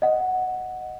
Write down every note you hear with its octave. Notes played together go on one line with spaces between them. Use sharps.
D#5 F#5